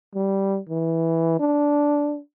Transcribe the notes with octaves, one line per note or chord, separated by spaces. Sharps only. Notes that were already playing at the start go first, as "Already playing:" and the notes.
G3
E3
D4